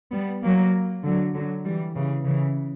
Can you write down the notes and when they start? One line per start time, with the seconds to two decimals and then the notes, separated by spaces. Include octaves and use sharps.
0.12 G3 B3
0.43 F#3 A#3
1.04 D3 F#3
1.34 D3 F#3
1.65 E3 G3
1.95 C#3 E3
2.26 C#3 E3